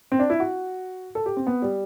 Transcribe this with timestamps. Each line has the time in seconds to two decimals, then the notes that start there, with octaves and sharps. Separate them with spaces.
0.12 C4
0.19 D4
0.30 E4
0.40 F#4
1.15 A4
1.26 G4
1.37 C4
1.47 B3
1.62 G3